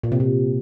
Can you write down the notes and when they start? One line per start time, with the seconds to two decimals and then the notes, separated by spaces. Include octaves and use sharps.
0.03 A#2
0.12 C3
0.20 A#2